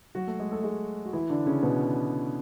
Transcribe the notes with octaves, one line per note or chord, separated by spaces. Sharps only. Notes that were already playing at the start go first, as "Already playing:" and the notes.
F#3 F#4
A3 A4
G#3 G#4
A3 A4
G#3 G#4
F#4
E3 E4
D3 D4
C#3 C#4
B2 B3